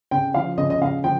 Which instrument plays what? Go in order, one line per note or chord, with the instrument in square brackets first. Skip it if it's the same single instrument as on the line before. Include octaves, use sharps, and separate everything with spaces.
[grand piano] C#3 G5
F3 F5
C#3 D#5
D#5
C#3 F5
F3 G5